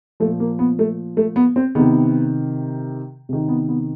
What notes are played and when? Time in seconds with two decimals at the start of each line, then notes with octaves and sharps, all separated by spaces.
0.20 F3 A3
0.25 A#2
0.40 A#3
0.59 B3
0.79 A3
1.17 A3
1.36 B3
1.56 C4
1.75 C3 D#3 B3
3.29 C3 D#3
3.49 B3
3.69 B3